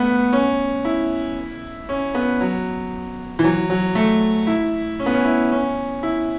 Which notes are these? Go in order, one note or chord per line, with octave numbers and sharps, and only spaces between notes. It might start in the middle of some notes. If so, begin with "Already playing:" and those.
Already playing: A3 B3
C#4
E4
C#4
B3
F#3
E3
F#3
F#3
A3
E4
C#4
B3
C#4
E4
C#4
E4